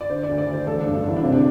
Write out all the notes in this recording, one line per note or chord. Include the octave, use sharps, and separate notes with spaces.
D5
D3 C5
D5
D2
D5
D2
C5
A1 A4
D4
G2
D4
A1 E4
D4
C3 C4
D4